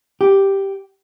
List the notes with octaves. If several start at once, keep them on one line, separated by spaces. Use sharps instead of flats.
G4